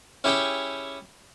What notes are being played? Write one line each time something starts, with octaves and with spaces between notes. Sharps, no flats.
C#4 E4 G4 G#4 C#5 G5